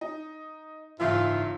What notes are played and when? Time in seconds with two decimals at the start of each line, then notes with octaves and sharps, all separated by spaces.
0.01 D#4
1.00 F#1 G#2 E3 F4 E5